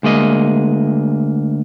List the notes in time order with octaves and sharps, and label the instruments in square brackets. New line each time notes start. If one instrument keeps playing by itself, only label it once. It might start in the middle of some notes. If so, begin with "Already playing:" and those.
[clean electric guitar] D2 G#3 A#3 D#5